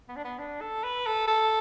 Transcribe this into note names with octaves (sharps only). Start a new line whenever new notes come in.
B3
D4
B3
D4
A4
B4
A4
A4